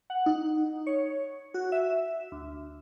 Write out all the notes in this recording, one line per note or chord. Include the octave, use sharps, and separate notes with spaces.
F#5
D#4
C#5
F#4
E5
D2